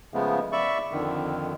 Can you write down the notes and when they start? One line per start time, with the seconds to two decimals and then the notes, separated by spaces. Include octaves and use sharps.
0.14 C#3 F3 G#3 A3 B3
0.52 D5 E5 B5 C#6
0.91 F2 D3 D#3